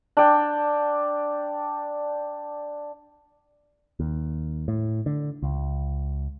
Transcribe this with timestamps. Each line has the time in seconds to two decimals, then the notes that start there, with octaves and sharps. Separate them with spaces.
0.17 D4 G5
4.00 D#2
4.68 A2
5.06 D3
5.42 C#2